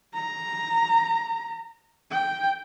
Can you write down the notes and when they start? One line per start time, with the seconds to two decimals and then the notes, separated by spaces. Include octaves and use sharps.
0.13 A#5
2.10 G5